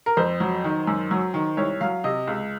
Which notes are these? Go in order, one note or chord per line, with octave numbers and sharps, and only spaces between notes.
A#4
F2 C5
F#3
D#3
F#2
F#3
D#3
C2 C#5
F#3 F5
C3 D#5
C#2